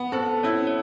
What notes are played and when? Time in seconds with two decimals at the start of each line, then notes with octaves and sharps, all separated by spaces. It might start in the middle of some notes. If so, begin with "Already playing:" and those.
Already playing: B3
0.12 C4 A4 C5
0.43 C#4 E4 C#5
0.67 C#5